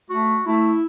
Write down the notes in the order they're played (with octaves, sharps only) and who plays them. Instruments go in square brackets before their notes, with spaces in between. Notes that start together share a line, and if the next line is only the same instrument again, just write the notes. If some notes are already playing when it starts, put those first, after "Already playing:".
[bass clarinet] A3 [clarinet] F#4
[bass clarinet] A3 [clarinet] E4